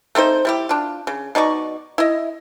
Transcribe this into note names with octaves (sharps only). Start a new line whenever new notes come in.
A3 C4 D#4 C5
G3 E4 G4
D4 F4
C#3
B2 D#4 D5 C#6
E4 D#5